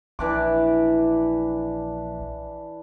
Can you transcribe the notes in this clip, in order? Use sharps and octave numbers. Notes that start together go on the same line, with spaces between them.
A#1 E3 D4 D6